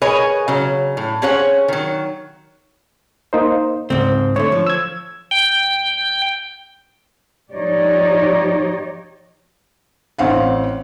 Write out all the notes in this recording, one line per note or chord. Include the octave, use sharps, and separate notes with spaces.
G#4 A#4 B4 C#5 D#5 G#5
C#3 F#3
A2
C4 C#4 G#4 C#5 F#5
D#3 F#3
A#3 D#4 C5
C#2 G#2 C4
D3 A3 C#5
F3
E6 G#6
G5
F3 D#4 G4 C#5 D5
A1 C4 F5 F#5